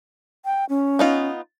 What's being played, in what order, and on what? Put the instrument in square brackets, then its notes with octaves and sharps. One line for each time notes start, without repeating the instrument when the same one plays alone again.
[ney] G5
C#4
[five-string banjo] B3 D#4 F4